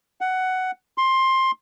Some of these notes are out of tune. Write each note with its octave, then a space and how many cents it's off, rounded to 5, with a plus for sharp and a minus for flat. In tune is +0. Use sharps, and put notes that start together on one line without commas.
F#5 +10
C6 +15